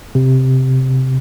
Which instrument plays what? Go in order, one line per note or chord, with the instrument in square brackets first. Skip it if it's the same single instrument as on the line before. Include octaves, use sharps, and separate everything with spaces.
[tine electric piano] C3